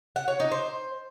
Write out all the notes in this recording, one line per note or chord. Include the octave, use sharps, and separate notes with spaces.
F#5
C#5
D#4
C5